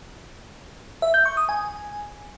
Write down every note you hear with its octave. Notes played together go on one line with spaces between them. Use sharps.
E5
G6
C#6
D#6
G#5